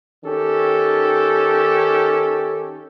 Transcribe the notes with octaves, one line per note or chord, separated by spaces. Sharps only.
D#3 C#4 G4 A4